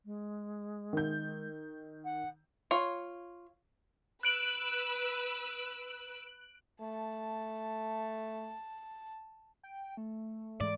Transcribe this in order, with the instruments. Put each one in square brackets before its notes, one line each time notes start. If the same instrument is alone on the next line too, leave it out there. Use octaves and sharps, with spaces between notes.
[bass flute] G#3
[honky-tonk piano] D#3 G6
[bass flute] F#5
[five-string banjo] F4 C#5
[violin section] B4 E6 [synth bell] F#6 D7 F#7
[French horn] A3 [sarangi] A5
[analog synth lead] G5
A3
[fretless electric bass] G#2 E3 G#3 [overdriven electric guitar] D5